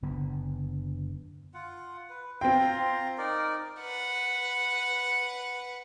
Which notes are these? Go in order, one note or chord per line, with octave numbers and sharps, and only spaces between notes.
F#1 D3 B3
F4 F#5
B4
C4 F4 G5 A#5 C6
D#4 A#4 D5
B4 F#5